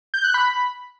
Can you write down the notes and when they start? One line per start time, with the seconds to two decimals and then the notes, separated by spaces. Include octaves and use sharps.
0.14 G6
0.24 F#6
0.34 B5